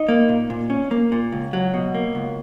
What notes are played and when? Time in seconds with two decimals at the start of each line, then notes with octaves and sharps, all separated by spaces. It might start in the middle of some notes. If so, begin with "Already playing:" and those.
Already playing: D#4 D#5
0.09 A#3
0.29 A#2
0.50 A#2
0.70 C#4
0.91 A#3
1.12 A#2
1.32 C#2
1.53 F#3
1.74 B2
1.94 A#3
2.15 C#2